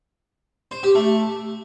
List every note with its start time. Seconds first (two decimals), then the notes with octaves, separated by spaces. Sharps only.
0.71 C5
0.83 G4
0.95 A3